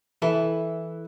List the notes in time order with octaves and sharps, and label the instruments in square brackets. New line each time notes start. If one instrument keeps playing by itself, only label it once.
[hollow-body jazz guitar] E3 E4 A4